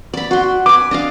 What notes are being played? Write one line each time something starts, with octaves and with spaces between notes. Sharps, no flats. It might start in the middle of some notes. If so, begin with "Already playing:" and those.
D5 B5
F#4 C6
B4 G#5 D6
D4 D#5 F5